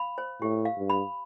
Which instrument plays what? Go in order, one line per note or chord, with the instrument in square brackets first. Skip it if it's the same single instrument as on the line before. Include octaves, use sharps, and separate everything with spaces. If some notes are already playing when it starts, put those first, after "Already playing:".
Already playing: [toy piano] F5 B5
C5
[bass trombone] A2 [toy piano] G4
[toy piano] F5
[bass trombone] G2
[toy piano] B5